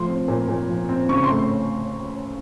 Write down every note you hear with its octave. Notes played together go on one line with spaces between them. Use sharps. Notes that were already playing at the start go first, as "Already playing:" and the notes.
Already playing: F3 A3 C6
C4
A#2
A#2
F3
C4
C#3 C#6
C6
A3